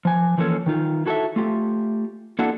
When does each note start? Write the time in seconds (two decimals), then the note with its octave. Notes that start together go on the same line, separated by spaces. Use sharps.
0.05 F3 G#5
0.38 E3 F3 A#3 C#4 A4 C#5
0.66 D#3 D#4 F4
1.06 E4 F#4 A4 B4 C#5 E5
1.36 A3 F4 G4
2.39 A#3 D4 E4 F#4 A4 F#5